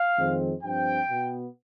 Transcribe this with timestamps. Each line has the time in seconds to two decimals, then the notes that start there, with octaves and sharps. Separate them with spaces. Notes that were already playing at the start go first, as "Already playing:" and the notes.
Already playing: F5
0.16 F2 D#3 G#3 C4
0.62 G2 F3 C4 G5
1.10 B2 B3